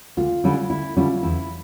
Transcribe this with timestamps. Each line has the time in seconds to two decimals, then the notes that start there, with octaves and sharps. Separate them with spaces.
0.17 D2 F4
0.44 D3 G3 C#4 E4
0.70 D2 E4
0.97 D3 G3 C#4 E4 F4
1.23 E2 E4